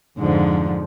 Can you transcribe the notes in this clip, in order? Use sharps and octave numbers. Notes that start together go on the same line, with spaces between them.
F2 G#2 D3 F3